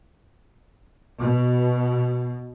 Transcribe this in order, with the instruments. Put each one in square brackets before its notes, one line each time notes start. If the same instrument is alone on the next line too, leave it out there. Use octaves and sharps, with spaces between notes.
[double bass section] B2